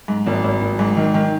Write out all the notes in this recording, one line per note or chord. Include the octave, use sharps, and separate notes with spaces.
G#2
G#1
G#1
G#1
G#2
D#3
D#3